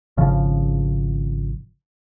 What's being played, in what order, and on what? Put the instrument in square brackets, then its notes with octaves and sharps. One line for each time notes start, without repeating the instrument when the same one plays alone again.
[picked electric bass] G#1 C#3 F3